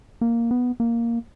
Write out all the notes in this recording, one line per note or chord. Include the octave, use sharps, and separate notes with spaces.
A#3
B3
A#3